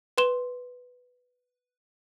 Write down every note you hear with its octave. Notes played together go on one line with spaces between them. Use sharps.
B4 C6 E7 G7